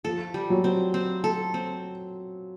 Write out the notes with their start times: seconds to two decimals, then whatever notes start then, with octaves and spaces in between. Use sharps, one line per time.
0.05 F3 A4
0.34 G3
0.50 F#3
0.64 C4
0.94 C4
1.24 A4
1.54 C4